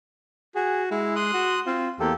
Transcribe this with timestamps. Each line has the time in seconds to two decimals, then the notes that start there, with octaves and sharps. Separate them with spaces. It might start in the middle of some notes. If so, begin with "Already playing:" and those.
0.55 F#4 G#4
0.91 G#3 E4
1.16 C6 D#6 F#6
1.34 F#4
1.66 C4 F4
2.00 E2 A#3 G4 A4